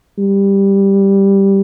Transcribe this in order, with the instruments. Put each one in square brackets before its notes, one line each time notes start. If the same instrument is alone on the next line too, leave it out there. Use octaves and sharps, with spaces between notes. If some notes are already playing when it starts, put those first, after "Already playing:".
[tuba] G3